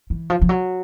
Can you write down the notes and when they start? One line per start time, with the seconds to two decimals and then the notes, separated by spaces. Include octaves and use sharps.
0.10 E3
0.30 F3
0.41 F3
0.49 F#3